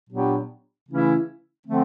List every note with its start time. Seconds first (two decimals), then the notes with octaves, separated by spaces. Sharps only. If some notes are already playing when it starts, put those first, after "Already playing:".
0.09 A#2 F#3 B3 D4 G4
0.88 C#3 E3 A3 C#4 E4
1.66 D3 F3 A3 C4